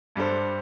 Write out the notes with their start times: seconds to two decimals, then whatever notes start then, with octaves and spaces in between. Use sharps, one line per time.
0.16 G2 G3 D4 A4 C5